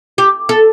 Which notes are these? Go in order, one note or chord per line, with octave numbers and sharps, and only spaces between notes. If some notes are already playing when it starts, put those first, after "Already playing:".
G4
A4